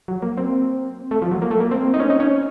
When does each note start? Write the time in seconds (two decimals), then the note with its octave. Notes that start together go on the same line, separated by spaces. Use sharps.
0.08 F#3
0.22 A#3
0.37 C4
1.11 A3
1.22 F3
1.32 F#3
1.42 A#3
1.51 A3
1.60 A#3
1.71 C4
1.94 D#4
2.00 C#4
2.10 D#4
2.20 C#4